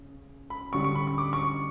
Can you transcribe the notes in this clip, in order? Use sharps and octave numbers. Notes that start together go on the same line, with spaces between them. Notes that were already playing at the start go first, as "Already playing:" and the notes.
Already playing: C#3
B5
D3 G3 C#4 C#6
C#6
B5
C#6
D6
C#6